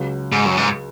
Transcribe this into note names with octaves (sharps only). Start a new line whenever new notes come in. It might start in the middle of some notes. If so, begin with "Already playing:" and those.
Already playing: C#2 C#3 F#3
G#2
F#2
G#2